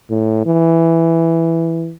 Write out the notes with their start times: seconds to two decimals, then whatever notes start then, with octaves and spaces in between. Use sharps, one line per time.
0.10 A2
0.46 E3